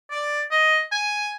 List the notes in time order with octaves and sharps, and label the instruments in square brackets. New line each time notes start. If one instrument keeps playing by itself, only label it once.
[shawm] D5
D#5
G#5